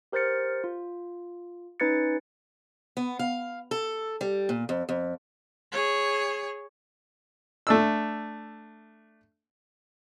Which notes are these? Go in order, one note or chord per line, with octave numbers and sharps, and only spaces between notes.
G4 A#4 C5 F6 A6 C#7
F4
C#4 D#4 B4 G#6 A6 C#7
B3
F5
A4
G3
A#2
F2
F2
G#4 C#5
A3 D4 E6